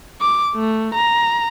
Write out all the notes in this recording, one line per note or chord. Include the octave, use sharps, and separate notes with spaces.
D6
A3
A#5